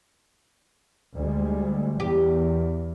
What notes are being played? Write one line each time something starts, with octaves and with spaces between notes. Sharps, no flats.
D2 G3 G#3
E2 G4